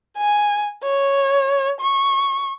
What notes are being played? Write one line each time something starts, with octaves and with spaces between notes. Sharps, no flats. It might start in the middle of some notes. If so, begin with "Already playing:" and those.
G#5
C#5
C#6